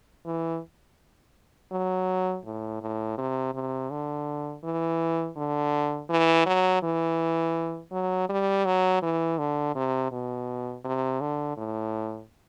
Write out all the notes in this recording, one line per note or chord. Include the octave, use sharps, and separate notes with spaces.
E3
F#3
A2
A2
C3
C3
D3
E3
D3
E3
F#3
E3
F#3
G3
F#3
E3
D3
C3
B2
C3
D3
A2